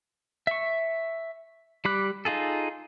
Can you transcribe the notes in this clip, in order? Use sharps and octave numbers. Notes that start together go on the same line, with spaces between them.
E5 C#6
G3 G4 B5 D6 F#6
D#4 F4 G#4 A4